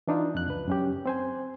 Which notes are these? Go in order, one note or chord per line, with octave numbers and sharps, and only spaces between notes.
E3 D4 D#4 F4
F2 F#6
C#2 B4
F#2 C#4 G4
C4 C5 G#5